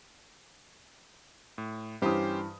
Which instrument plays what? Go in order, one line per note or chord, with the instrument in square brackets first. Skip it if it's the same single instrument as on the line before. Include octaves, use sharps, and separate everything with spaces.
[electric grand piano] A2
[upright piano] G2 E3 D#6 [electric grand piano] C#4 G4 C5